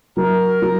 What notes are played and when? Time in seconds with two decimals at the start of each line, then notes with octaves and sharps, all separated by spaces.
0.17 F#3 A#4
0.62 F#3